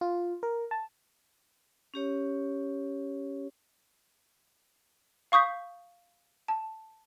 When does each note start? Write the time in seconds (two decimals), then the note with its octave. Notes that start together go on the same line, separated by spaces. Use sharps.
0.01 F4
0.43 A#4
0.71 A5
1.94 C#4 G4 C#5
5.32 F5 C#6 D#6 G6 B6
6.48 A5